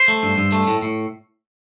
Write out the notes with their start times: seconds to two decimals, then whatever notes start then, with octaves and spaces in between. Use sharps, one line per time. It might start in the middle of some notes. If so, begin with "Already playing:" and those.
Already playing: C5
0.08 A3
0.23 G2
0.38 G2
0.52 A3
0.68 A2
0.82 A2